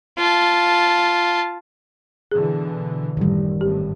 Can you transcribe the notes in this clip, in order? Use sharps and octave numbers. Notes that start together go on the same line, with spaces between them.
F4 A5
B2 D3 E3 G#4
A1 F#2 D#3 G3
G#1 A2 G4